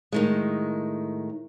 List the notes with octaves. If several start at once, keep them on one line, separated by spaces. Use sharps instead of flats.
A2 D#3 G#3